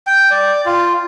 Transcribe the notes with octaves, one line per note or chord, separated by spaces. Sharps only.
G5
D5
F4